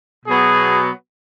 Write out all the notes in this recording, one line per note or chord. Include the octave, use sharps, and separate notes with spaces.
B2 F#3 B3 G#4